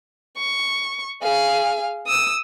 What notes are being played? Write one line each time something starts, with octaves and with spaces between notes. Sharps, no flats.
C#6
G#4 F5
D#6 E6